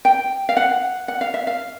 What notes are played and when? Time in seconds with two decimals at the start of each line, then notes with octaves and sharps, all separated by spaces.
0.05 G5
0.49 F5
0.57 F#5
1.08 F#5
1.21 F5
1.34 E5
1.47 F5